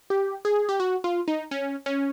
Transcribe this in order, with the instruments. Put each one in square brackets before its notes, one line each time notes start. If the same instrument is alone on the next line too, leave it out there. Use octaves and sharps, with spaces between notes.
[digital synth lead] G4
G#4
G4
F#4
F4
D#4
C#4
C#4